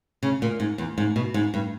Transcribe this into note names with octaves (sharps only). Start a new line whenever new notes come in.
C#3
A#2
G#2
E2
G#2
B2
G#2
G2